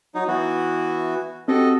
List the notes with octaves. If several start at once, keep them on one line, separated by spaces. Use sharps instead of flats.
F#3 D#4
E3 B3 F#4
C4 F#4 G4 A4 D#5